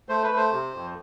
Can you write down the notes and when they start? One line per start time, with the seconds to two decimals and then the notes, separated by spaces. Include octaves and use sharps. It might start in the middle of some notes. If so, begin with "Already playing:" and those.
0.09 A3 C5
0.24 B4
0.31 A3
0.37 C5
0.52 C3
0.74 F2